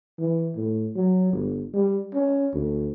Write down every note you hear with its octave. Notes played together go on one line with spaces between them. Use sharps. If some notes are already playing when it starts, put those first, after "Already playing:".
E3
A2
F#3
G1
G3
C#4
D2